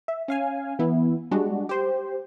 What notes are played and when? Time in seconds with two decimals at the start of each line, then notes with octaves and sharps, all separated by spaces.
0.08 E5
0.28 C#4 F5 G#5
0.79 E3 B3 E4
1.31 G3 G#3 D4 F#4
1.69 G4 C5